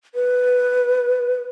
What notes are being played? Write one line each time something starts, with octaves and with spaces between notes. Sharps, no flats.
B4